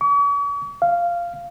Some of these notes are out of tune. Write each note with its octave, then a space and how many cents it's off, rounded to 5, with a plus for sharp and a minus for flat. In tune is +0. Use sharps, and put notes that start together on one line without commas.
C#6 +45
F5 -10